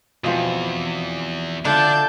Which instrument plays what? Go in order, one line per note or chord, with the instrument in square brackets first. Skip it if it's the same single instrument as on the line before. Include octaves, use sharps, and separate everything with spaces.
[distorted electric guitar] E2 [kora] B2 F3 C4
[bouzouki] D3 [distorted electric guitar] D4 [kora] F4 E5 F#5 [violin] A5 G6